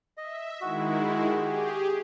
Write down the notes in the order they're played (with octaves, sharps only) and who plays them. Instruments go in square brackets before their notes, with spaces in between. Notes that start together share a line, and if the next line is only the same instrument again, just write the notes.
[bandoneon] D#5 [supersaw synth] E5
[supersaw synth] D#3 G#3 E4 [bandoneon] F#4
[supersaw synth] G4 G#4